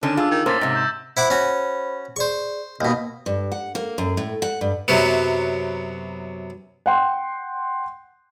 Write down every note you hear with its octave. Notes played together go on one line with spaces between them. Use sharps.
D3 D#3 C#4 D4
F4 G#4 D6 E6
D#3
A2 A#3 C#4 C5 F6 A6 B6
G#2 C3 A#6
E6 G6 E7
E4 C5 F#5 B5 D6
C#4 F#4
G#4 C5 D5 C#6
D#2 B2 D#5 F5 D#6
G2
F#5
A#3
F#2
A2
F#5
G2
F#2 C3 F#3 B3
F#5 G5 C6